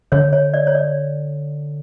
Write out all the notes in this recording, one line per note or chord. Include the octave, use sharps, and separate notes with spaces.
D3 C#5
C#5
D5
C#5
D5